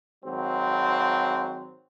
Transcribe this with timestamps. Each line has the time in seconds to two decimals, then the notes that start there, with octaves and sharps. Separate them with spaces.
0.24 G#1 F#3 C4